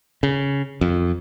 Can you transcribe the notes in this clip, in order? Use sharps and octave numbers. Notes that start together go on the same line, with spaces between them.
C#3
F2